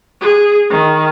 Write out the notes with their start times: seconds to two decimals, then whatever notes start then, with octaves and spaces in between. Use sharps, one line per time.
0.21 G#4
0.70 D#3